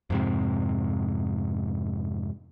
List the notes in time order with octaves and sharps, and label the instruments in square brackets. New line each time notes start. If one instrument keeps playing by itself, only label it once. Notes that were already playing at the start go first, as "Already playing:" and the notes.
[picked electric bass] F2 G#2 C3